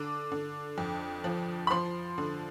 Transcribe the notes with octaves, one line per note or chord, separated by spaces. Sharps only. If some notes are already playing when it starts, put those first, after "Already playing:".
Already playing: D3 D6
D3
F2
F3
B5
F3 C6
D3